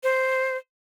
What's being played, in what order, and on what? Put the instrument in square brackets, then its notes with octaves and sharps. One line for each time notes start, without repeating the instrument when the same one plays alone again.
[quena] C5